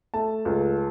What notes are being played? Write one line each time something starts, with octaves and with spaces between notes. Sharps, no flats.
A3 A5
C#2